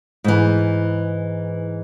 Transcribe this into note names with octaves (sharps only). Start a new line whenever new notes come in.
G#2 E3